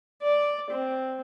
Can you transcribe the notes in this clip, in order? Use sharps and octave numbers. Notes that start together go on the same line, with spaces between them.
D5
C4